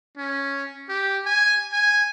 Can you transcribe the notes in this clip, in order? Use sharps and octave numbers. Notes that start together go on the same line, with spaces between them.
C#4
G4
G#5
G#5